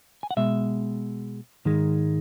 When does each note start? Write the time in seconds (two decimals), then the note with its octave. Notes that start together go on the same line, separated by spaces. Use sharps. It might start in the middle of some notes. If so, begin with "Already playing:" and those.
0.23 G#5
0.31 F#5
0.37 B2 G#3 E5
1.65 G#2 D#3 G#3